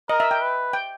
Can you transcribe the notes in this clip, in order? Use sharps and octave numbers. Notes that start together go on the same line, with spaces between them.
A#4 D#5
E5
G5
B4
G5